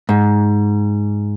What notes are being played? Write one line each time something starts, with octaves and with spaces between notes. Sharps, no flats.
G#2